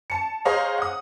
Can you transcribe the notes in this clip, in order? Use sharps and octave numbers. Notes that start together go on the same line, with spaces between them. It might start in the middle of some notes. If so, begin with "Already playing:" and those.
A5 C#7
G#4 C5 C#5 D#5 F5 A#5
F#5 D#6